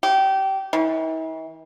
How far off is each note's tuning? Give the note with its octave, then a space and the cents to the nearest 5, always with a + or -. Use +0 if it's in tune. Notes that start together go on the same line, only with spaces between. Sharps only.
G4 -25
E3 -45